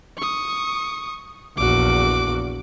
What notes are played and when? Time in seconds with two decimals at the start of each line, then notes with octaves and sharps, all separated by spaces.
0.18 C#6 D#6
1.57 A#1 E2 F#4 D6